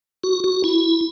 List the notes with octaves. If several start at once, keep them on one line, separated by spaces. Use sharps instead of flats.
F#4
F#4
E4